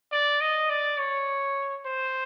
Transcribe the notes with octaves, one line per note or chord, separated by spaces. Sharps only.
D5
D#5
D5
C#5
C5